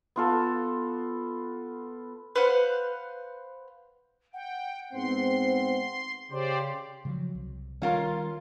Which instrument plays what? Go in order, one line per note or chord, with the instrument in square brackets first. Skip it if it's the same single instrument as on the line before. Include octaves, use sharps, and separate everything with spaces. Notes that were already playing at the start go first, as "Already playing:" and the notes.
[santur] B3 F4 A4
[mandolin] B4 C5 F5 F#5
[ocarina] F#5 [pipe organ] G5
[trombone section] G#2 B3 C4 [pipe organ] C6
[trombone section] C#3 [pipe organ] G4 C5 D5 [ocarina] C6
[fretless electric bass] C#3 F3 F#3
C2
[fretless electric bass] D#3 G3 [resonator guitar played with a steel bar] C#4 F4 A#4